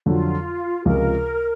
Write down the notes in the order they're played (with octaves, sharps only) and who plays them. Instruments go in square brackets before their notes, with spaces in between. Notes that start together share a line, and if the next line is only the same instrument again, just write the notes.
[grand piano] F2 D3 F#3 [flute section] F4
[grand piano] C#2 C3 F3 [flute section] A#4